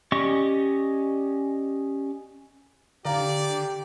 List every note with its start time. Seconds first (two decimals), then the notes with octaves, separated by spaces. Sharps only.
0.12 C#4 G4 D5 D#5 C#6
3.05 D3 G4 D5 F5 A#5